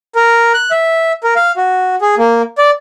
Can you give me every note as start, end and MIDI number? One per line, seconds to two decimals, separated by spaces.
0.15 0.52 70
0.54 0.71 90
0.71 1.12 76
1.24 1.34 70
1.36 1.52 77
1.57 1.95 66
2.01 2.15 68
2.18 2.42 58
2.58 2.70 74